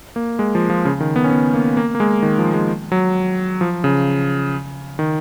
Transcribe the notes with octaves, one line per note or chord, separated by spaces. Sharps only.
A#3
G#3
F3
F3
C#3
D#3
B3
C#4
B3
A#3
A#3
A#3
G#3
D#3
F3
G#3
F#3
F3
C#3
D#3